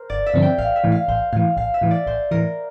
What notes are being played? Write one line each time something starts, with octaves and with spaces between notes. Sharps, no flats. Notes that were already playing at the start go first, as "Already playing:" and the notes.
Already playing: A#4 C5
G1 D5
E5
G2 D3 F3 C4
G5
A1 F5
E5
A2 E3
F5
A1 C5
A2 E3 F5
A1 F5
E5
A2 E3
D5
A1 C5
A2 E3 A#4